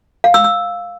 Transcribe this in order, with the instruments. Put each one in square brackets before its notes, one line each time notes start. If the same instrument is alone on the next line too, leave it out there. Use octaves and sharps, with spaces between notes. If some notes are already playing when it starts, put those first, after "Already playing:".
[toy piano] F5
E6
E6